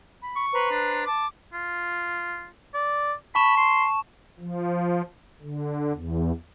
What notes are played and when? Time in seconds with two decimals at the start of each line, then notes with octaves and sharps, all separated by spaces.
0.23 B5
0.36 C#6
0.52 B4 C5 A#5
0.71 D4
1.06 A5 D6
1.54 F4
2.74 D5
3.35 A5 B5 C#6 E7
3.57 C6
4.40 F3
5.41 D3
5.93 E2